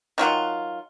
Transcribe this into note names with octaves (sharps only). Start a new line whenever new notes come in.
D#3 F#3 F4 F#5